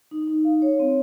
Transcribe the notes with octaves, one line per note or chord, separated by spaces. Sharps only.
D#4
D#4
F5
C#5
C4